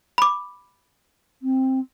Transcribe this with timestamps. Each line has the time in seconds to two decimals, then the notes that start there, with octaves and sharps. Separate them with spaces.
0.18 B5 D6
1.42 C4